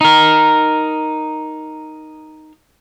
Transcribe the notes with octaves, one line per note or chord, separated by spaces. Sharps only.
D#4 A#4